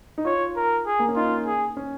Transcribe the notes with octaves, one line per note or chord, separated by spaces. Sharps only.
D#4
F4 C#5
A#4
G#4
A#3
C#4
D#4 F4
G#4
C#4